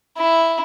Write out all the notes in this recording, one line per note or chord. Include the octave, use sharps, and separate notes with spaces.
E4